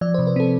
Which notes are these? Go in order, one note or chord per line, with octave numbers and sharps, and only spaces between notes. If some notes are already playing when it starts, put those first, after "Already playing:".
F3 D5
C3 C5
B4
C4 A4